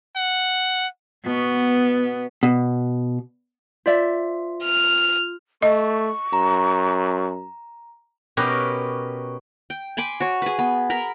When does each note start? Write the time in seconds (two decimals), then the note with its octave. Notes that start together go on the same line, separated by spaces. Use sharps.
0.16 F#5
1.26 B2 B3
2.43 B2
3.86 F4 C5 D5 E5
4.64 F6
5.62 A3 D#5 C#6
6.33 F#2 A#5
8.37 B2 C#4 G4 A#4 B4
9.70 G5
9.97 G#5 B5 C6 D6
10.20 F#4 C#5
10.42 G#4 B4
10.59 B3
10.90 A#4 B5